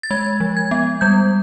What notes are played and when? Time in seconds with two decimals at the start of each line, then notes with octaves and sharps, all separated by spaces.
0.03 A6
0.11 G#3 G#6
0.40 F3
0.57 G#6
0.71 B3
1.01 G3 G6